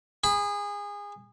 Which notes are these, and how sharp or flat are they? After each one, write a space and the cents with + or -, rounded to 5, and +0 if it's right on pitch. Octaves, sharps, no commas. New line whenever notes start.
G#4 -25 B5 +0